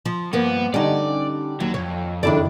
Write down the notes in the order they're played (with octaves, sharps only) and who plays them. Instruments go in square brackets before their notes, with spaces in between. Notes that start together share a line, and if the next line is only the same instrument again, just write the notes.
[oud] F3
[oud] G2 F3 A#3 [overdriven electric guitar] B3
[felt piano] D3 G3 [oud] C#4 D#4 [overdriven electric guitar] D5
[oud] D#2 [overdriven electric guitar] F#3
[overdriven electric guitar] C2 F2 [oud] C#5
[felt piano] F#1 D#3 E4 [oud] D4 A4 D5